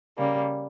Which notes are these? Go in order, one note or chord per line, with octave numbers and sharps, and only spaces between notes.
C#3 G3 A#3